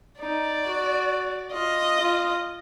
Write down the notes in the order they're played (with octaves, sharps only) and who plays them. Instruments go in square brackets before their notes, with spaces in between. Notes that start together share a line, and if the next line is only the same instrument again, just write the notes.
[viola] D#4 [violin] D5
[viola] F#4
[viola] F4 [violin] D#5
[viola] F4